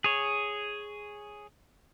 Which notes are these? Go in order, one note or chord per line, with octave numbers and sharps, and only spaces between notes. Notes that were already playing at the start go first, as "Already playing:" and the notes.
G#4 C#5